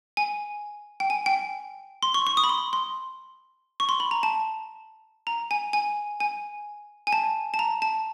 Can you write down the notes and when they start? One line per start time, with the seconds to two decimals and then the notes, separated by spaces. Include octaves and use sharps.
0.17 G#5
1.00 G5
1.10 G#5
1.26 G5
2.03 C6
2.14 C#6
2.27 C#6
2.37 D#6
2.44 B5
2.49 C6
2.73 C6
3.80 C#6
3.89 C6
4.00 B5
4.11 A#5
4.23 A5
5.27 A#5
5.51 G#5
5.73 G#5
6.20 G#5
7.07 G#5
7.13 A5
7.54 A5
7.59 A#5
7.82 A5